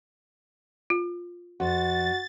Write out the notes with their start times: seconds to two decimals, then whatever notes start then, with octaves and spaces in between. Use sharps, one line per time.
0.90 F4
1.60 F2 F#4 A6